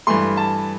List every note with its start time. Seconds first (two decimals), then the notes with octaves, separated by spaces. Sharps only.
0.07 G2 E3 A3 C6
0.37 A5